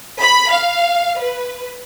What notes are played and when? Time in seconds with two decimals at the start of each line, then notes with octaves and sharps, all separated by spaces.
0.21 B5
0.51 F5
1.19 B4